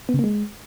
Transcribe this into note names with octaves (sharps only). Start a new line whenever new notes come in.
B3
C#3
A#3
G#3